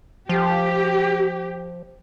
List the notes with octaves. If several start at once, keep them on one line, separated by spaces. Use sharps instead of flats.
F3 G4